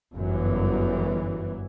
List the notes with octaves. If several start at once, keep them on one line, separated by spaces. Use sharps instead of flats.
G1 F#2 E3